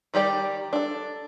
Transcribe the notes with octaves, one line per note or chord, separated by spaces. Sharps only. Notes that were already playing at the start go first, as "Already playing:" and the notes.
D#3 G3 G4 D5
D4 A4